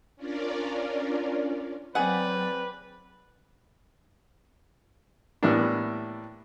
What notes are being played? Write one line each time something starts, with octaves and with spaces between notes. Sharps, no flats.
C#4 D4 F4 A#4 D5
F#3 C4 G#4 B4 D5 F#5
A2 E3 G3 A#3 B3 D4